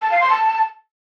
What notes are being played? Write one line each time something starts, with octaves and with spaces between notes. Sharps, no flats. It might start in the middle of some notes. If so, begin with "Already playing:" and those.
A5
F5
C6
A5